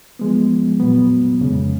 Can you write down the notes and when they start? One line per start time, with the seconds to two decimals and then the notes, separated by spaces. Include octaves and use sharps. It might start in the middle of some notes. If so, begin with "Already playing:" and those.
0.19 F3 G#3 B3
0.80 A#2 F#3 B3
1.40 F2 C#3 G#3